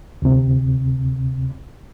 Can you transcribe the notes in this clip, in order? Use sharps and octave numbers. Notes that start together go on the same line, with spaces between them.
D2 C3